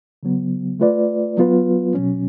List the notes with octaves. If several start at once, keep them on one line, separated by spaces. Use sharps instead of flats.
C#3 F#3 B3
A3 F4 B4 D5
F#3 B3 F4 B4
B2 F#3 C#4